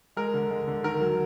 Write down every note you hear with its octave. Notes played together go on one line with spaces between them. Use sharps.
G#3 A#4
D3
G#3
D3
D#3 A#4
F#3